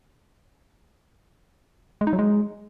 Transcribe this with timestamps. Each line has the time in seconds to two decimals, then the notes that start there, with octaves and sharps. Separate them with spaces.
2.01 G#3
2.07 D#4
2.13 F#3
2.19 G#3